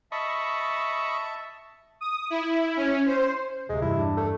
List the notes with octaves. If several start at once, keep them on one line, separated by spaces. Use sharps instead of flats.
D#5 E5 A5 B5 C#6
D#6
E4
C#4
C5
D1 C3 G#3
E2 G2 E4
D4
A3